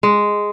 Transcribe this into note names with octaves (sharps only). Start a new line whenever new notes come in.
G#3